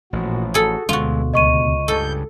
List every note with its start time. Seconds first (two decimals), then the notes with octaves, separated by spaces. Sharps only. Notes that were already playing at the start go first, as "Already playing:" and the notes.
0.13 A1 A#2 F3 F#4
0.54 F#4 G#4 A4
0.89 D2 B2 D3 G#3 F4 F#4
1.34 C#2 D#5 C#6 D#7
1.88 C#2 G2 C#3 A4 G6